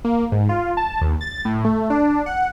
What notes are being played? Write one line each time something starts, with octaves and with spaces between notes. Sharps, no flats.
A#3
G#2
F4
A5
D#2
A6
A2
A3
D4
F#5